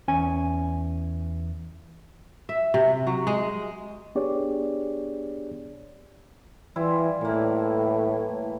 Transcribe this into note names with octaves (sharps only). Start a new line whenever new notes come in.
E2 C#4 G#5
E5
C3
F#3
G#3
B3 D4 G4 G#4 C#5 D5
E3 G3 E4 F4
A2 E3 A#3